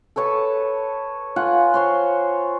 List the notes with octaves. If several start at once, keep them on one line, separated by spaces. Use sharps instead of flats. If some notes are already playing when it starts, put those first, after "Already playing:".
A4 B4 C#5 A5
F4 F#5 G#5
C5 C#5 C6